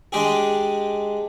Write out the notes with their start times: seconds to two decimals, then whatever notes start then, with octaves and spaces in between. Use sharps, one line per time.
0.12 G#3 D4 G4 G#4